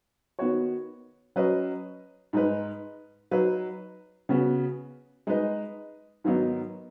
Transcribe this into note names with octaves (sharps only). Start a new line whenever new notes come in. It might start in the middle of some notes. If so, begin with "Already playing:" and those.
D#3 B3 F#4 C#5
F#3 C#4 B4 D#5
G#2 G#3 D#4 B4
F#3 D#4 B4
C#3 B3 F#4
G#3 D#4 B4 D#5
G#2 D#3 F#3 B3 D#4